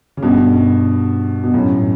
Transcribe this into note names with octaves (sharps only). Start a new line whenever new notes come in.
C#3
G2 B2
B2
F#2 A2